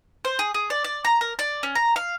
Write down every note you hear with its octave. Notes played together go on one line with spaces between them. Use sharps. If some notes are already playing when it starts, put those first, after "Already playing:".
C5
G#4
G#4
D5
D5
A#5
A#4
D5
C#4
A#5
F5